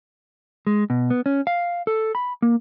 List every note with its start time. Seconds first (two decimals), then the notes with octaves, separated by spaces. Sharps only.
0.67 G#3
0.90 B2
1.10 B3
1.26 C#4
1.47 F5
1.87 A4
2.15 B5
2.42 A#3